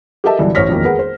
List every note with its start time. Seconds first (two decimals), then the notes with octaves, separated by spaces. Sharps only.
0.24 G4 A4 A#4 D#5 E5 A5
0.39 B1 G2 D3 E3
0.55 A1 C5 C#5 F6 A#6 B6
0.69 E1 F2 D#3 A#3
0.85 G#4 A#4 B4 F#5
0.99 C5